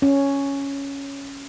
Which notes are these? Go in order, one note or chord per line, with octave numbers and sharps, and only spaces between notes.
C#4